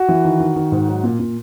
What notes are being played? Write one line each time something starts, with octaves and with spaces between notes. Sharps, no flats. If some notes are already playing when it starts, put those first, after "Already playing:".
Already playing: F#4
E3
D#3
D#3
D#3
G#2
F#3
A#2
A#2